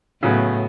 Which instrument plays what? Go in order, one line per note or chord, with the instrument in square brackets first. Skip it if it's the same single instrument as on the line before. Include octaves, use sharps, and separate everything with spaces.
[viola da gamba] A2 [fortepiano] C#3 F#3 B3